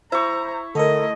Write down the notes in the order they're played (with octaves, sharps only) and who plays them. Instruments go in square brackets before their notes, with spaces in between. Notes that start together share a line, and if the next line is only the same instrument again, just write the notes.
[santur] E4 C#6 [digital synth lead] C5 [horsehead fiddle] A#5
[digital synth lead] D3 [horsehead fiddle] A3 D#5 [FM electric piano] A4 A#4